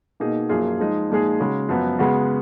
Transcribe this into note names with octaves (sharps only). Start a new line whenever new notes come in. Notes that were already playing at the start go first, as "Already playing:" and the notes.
B2 A#3 D#4 G#4
F#2 F3 A#3 F4 G#4
F3 G#3 D#4
A#2 F3 G#3 D#4 G#4
C#3 G#3 C#4 F#4
F#2 F3 B3
C#3 G#3 B3 F#4